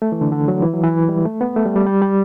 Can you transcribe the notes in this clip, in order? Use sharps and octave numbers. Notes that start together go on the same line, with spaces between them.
A3
E3
D3
D3
F#3
E3
F#3
E3
G3
A3
B3
A3
G3
G3
G3
G3